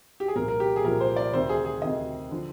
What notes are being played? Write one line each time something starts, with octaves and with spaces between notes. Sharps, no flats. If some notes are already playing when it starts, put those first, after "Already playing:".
G4
G#4
C2 A#2 F3 A#4
A#4
G4
G#4
C2 A#2 F3 A#4
C5
D5
D2 C3 D#3 C5
G#4
G#4
D2 C3 D#3 D#5
D3 F3